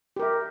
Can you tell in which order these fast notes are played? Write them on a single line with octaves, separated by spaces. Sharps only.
G4 A#4 E5